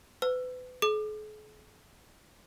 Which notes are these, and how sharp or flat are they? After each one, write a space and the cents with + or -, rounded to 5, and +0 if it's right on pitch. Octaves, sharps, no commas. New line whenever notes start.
B4 +35 E6 +20
G#4 +45 D6 +30